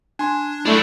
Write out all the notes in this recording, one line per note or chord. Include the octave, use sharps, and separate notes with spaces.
D4 G#5 C6
F#2 A3 D4 E4